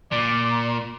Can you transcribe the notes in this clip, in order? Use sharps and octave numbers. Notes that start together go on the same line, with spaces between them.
A#2 D5